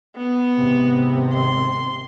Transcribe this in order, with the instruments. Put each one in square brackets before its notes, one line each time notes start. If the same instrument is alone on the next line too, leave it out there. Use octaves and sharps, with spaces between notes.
[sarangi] B3
[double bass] G#1 C3
[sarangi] C6